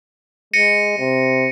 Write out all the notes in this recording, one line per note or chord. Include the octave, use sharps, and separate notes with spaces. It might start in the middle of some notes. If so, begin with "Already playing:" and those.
G#3 A#6 C#7 D#7
C3